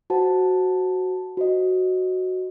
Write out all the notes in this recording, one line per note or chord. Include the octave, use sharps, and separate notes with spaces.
F#4 C5 F#5 A5
F#4 C5 D#5